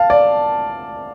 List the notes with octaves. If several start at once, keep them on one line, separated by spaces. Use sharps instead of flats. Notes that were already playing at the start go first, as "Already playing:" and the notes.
Already playing: F5 A5
D5